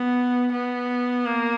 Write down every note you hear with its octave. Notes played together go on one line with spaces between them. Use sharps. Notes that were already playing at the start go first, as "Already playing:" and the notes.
Already playing: B3
B3
A#3